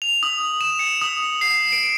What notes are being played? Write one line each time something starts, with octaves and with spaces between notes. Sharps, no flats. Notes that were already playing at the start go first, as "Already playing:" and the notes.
F7
D#6
E7
C#7
D#6
C7
D7